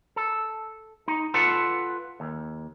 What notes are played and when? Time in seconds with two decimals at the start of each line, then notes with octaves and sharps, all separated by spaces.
0.16 A4
1.08 D#4
1.34 F4 A4 B4 F#5 A5
2.20 D#2